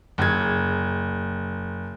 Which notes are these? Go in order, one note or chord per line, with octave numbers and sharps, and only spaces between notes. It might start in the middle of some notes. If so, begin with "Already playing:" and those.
F#1 G#6